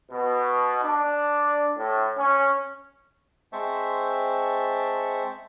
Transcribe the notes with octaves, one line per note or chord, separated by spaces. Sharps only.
B2
D4
A2
C#4
G#3 C4 C5 E5 A5 C#6